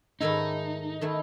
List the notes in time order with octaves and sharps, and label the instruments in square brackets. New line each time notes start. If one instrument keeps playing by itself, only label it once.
[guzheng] G#2 D#3 A3 E4 [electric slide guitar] D#4
[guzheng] D#3 A3 E4